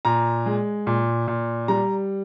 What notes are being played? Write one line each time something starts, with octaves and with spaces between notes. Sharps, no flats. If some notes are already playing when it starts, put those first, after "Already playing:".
A#2 A#5
G#3
A#2
A#2
G3 A#5